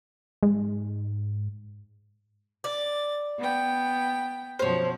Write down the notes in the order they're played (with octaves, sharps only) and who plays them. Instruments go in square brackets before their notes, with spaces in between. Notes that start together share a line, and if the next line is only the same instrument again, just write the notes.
[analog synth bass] G#2
[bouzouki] D5 [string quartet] A6
[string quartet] B3 G5
[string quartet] F#2 B2 F3 [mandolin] C5 C#5